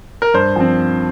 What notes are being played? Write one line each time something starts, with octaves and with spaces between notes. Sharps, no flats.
A#4
G2 C5
F3 C4